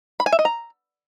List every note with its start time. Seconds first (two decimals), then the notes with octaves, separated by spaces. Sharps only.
0.20 B5
0.26 G#5
0.32 E5
0.39 D#5
0.45 A#5